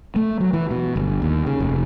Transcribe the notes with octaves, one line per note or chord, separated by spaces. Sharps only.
A3
F#3
E3
B2
G1
D#2
C#3
F1